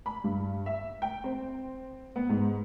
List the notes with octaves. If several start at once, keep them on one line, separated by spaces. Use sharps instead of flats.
B5
G2
E5
G5
C4
B3
G#2